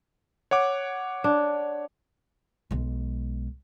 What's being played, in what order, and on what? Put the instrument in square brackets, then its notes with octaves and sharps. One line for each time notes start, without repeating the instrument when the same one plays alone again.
[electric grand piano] C#5 F#5 D6
[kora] D4
[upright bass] B1 G#3